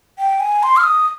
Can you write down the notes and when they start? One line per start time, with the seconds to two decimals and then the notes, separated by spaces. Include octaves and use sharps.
0.18 G5
0.40 G#5
0.63 C6
0.77 F6
0.83 D#6